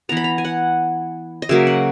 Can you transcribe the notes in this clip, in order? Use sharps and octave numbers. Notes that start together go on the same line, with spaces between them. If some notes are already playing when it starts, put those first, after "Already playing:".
E3 B3 A#5
B5
A#5
G#5
F#5
D#5
C#3 F#3 A#3 E5
F#5